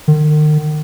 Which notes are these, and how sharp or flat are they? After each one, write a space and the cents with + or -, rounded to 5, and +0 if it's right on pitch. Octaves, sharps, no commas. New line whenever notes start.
D#3 -40